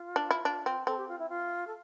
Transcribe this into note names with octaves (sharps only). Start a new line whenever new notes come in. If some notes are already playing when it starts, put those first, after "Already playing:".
Already playing: F4
D4
E4
D4
C4
C4 A4
G4
F4
E4
F4
A4